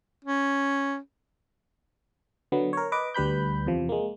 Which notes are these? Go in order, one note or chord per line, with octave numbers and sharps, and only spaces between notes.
C#4
D3 F#3 B3
A#4 C#5
B4 D#5 D6
D2 G3 B4 B5 G6
E2 C3 F3
G#3 A#3